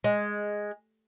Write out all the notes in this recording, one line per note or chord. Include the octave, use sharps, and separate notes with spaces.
G#3